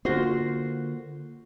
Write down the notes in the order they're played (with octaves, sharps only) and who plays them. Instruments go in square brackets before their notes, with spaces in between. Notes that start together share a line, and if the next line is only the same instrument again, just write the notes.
[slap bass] D3 A#3 [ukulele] F4 F#4 C5